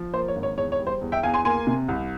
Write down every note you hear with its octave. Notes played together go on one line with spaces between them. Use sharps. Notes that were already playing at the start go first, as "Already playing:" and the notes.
Already playing: F3
A#3 C5
C#5
G#1
C#5
E2 C#5
C#5
G3
C5
E2
E5 G5
E2 F5 G#5
G#5 C6
A#3 G#5 C6
C3
C2